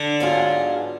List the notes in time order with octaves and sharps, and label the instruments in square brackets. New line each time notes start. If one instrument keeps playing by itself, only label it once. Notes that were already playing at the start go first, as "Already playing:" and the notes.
Already playing: [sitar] D3
[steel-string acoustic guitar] G#2 F#3 B3 F4 G#4